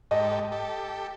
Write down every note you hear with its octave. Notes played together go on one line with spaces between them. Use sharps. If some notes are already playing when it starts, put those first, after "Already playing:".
G#2 G4 A4 D#5
G4 A4